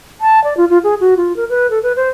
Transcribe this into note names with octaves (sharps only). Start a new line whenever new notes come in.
A5
D5
F4
F4
G#4
F#4
F4
A#4
B4
A4
B4
C5